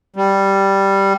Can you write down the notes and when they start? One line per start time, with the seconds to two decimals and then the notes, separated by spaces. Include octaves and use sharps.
0.16 G3